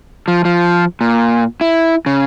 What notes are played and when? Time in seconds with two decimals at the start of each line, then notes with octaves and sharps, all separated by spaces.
0.28 F3
0.45 F3
1.01 A#2
1.61 E4
2.06 C#3